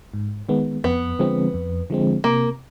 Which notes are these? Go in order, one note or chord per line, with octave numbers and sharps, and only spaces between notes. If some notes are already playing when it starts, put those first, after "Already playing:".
G#2
D#3 G#3 B3
F2 B3
D3 F3 G#3 C4
F2
D3 F3 G#3 C4
C3 A#3